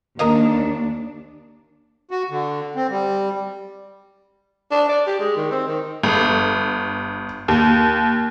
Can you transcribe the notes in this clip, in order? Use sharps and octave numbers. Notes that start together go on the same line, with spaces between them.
D#2 D4 A#4 D#5 F5
F#4
D3
C4
G3
D4
D5
G4
G#3
D#3
C4
D#3
G1
D#2